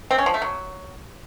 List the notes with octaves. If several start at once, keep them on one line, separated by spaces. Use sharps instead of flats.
C4
C#4
F3
A3
F#3